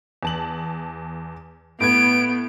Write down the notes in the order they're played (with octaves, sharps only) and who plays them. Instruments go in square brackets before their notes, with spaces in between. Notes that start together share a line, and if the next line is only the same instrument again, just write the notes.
[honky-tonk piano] E2 A5 F#7
[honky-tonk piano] A2 B4 G#6 [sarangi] B3 [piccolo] D7